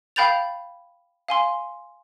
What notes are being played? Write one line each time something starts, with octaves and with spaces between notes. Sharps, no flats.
F5 G5 B5 G6 A6 F7
F5 G#5 C6